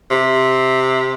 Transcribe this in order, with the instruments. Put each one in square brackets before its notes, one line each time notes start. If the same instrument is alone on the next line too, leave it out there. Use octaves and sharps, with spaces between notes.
[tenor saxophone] C3